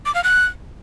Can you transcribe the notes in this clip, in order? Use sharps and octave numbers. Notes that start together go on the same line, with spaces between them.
D6
F5
F#6